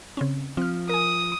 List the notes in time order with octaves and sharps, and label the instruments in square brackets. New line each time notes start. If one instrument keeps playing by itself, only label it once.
[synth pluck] C#3 C4 C#4
[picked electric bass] F3 [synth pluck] C4 F6
[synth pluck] A#4 G#5 [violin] D#6